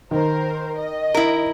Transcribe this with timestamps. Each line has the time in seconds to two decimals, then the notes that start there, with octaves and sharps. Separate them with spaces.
0.11 D#3 A#4 C5
0.78 D#5
1.14 E4 A#4